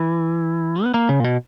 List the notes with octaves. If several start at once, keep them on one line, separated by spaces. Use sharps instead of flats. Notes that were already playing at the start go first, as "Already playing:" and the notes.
Already playing: E3
B3
A#3
C#3
A#2
B2